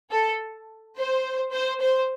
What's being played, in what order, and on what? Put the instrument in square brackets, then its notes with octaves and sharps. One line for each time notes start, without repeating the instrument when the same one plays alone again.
[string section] A4
C5
C5
C5